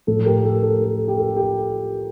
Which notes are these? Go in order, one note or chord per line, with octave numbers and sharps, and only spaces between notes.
A2 F3 A3 A4
G4 A#4
A4
A4
A4
G4
A4
G4